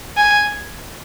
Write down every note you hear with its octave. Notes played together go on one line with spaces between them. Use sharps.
G#5